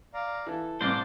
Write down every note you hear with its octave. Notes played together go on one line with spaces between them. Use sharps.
D5 F5 A#5
E3 A4
A1 G2 C3 C5 D5